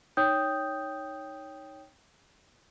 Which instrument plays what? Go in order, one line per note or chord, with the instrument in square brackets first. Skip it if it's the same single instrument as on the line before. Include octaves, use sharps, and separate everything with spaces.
[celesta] D#4 C#5 G5 D#6 G6